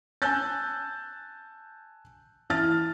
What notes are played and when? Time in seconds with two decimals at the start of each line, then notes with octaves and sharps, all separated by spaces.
0.22 G#5 A5 E6 F#6 G6 A6
2.50 E3 E4 A5 F6 A6